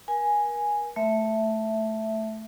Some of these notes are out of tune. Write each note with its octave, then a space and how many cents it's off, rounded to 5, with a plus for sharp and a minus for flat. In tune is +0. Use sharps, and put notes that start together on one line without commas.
A#4 +35 G#5 +0
A3 +0 E5 +0